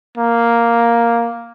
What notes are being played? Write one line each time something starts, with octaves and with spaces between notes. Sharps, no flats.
A#3